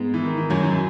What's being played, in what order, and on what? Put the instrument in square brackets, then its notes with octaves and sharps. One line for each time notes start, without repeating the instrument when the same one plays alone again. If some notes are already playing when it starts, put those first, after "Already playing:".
Already playing: [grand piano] G#2 G#3 [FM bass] B3
[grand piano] E3
D#3
E3
F#2 F#3
E3